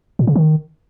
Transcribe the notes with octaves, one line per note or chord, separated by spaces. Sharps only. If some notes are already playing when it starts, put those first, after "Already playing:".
A#2
C#3
D#3